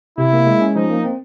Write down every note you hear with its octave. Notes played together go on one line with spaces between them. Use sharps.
C3 E4
A#3
G#3
C#4
F3 D#4
A#3
C4